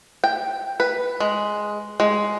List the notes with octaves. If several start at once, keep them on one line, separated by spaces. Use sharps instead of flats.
G5
B4
G#3
G#3